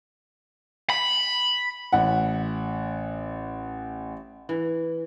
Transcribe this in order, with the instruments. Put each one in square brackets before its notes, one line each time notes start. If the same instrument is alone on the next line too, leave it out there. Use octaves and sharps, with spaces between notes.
[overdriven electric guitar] B5
[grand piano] A1 F#5
[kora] E3